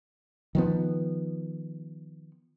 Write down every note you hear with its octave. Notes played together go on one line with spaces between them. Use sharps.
D#3 F3 B3